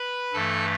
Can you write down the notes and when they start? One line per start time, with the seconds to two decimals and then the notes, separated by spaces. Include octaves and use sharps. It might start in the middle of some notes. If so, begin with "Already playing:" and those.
Already playing: B4 B5
0.33 G2 E3 A3 A4 A5